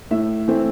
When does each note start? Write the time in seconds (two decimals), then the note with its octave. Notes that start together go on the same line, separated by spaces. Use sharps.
0.11 A2 E5
0.48 E3 A3 C4